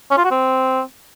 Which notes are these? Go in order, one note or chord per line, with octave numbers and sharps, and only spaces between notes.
C#4
F4
F#4
C4